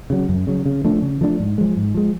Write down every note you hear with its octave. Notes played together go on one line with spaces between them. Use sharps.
C#3 F#3
F#2
C#3 F#3
C#3
F3 A3 D4
C#3
F3 A3 D4
G#2
F3 G#3
G#2
F3 G#3